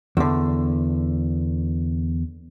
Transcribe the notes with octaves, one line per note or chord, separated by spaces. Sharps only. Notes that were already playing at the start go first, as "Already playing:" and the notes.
E2 D3